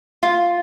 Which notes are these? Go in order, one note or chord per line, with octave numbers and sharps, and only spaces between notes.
F4